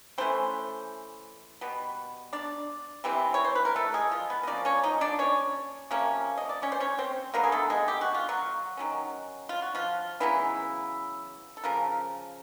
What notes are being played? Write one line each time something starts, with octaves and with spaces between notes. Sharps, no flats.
E3 A3 C4 C#4 C5
B2 G3 B3
D4 D5
C3 E3 G3 C4
C#5
C5
B4
A#4
A3 A4
G#3 G#4
F3 F4
B3 B4
D#5
F3 A#3 C#4 D5
C#4 C#5
D#4 D#5
D4 D5
C#4 C#5
C3 F3 A#3 C#4
D#5
D5
C#4 C#5
C5
C#4 C#5
C4 C5
D3 F#3 A#3 B3 A#4
G#4
A3 A4
G#3 G#4
G4
F#4
F4
F#3 F#4
D#3 F#3 A3 C#4
F4
F#4
F3 F4
C#3 E3 F#3 B3 E4
A4
C#3 F3 A#4